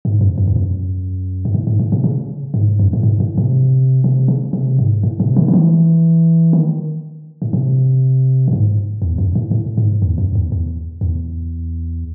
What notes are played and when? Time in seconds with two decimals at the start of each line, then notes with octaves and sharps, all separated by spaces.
0.05 G#2
0.21 F#2
0.38 F#2
0.48 E2
0.56 F#2
1.45 G#2
1.54 A2
1.67 G#2
1.79 A2
1.92 C3
2.04 C#3
2.54 G#2
2.80 F#2
2.93 A2
3.03 G#2
3.20 A2
3.38 C3
4.04 C3
4.28 C#3
4.53 C3
4.79 G#2
5.03 A2
5.20 C3
5.36 D#3
5.48 D#3
5.53 E3
6.53 D#3
7.42 A2
7.53 C3
8.48 A2
8.53 G#2
9.02 E2
9.18 F#2
9.35 A2
9.51 A2
9.78 G#2
10.02 E2
10.18 F#2
10.35 E2
10.52 E2
11.01 E2